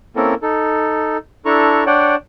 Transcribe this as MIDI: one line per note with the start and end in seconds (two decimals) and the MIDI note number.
0.16 0.34 58
0.16 0.34 60
0.16 0.34 61
0.16 0.34 64
0.16 0.34 69
0.16 0.34 70
0.42 1.17 63
0.42 1.17 69
1.45 1.84 62
1.45 1.84 64
1.45 1.84 69
1.45 1.84 82
1.45 1.84 85
1.86 2.16 62
1.86 2.16 73
1.86 2.16 74
1.86 2.16 78
1.86 2.16 79